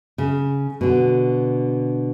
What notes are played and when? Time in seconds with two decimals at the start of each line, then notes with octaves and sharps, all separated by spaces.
0.18 C#3
0.81 B2 D3